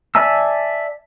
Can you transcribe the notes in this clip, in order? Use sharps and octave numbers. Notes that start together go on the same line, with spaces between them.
D5 E5 G#5 A5 E6